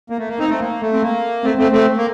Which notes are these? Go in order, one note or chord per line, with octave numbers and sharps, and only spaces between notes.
A#3
A3
A#3
C4 D#4
A3 C4
A#3
A3
C4
A#3
A3 C4
A3 C4
A3 C4
A#3